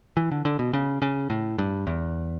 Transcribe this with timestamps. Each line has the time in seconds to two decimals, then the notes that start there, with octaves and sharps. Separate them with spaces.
0.17 E3
0.32 D3
0.45 D3
0.59 B2
0.73 C#3
1.02 C#3
1.30 A2
1.58 G2
1.87 E2